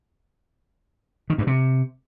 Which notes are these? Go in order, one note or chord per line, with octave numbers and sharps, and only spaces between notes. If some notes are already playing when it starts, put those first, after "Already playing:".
D#3
G2
C3